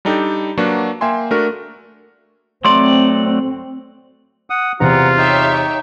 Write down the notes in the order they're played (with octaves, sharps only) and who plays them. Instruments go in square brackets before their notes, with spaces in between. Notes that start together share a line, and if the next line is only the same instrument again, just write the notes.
[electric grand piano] G3 D4 D#4 G4 A4
F#3 A#3 D4 F#4 B4
A#3 E5 G5 G#5 C6
A3 D4 F#4 A#4
[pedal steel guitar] F#3 A3 D5 [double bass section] C4 [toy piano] C6
[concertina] F#5 D#6
[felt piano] E2 C3 [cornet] F4 [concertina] F#5 A#5
[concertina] D#4 [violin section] G4 C#5 E5